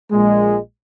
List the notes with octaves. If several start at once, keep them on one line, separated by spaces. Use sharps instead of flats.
A#1 A#2 G#3